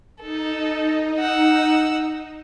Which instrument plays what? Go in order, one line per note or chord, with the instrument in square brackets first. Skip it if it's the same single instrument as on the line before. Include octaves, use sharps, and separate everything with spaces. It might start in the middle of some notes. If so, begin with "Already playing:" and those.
[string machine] D#4 [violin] A4
[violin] F#5 E6